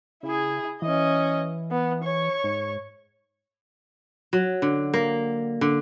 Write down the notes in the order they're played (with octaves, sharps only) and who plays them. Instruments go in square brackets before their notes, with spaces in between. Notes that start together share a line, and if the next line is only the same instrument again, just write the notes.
[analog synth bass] C#3 [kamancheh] E4 G#4
[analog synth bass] E3 [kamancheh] C#4 D#5
[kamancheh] B3
C#5 C#6
[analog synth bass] G#2
[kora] F#3
D3
A#3
D3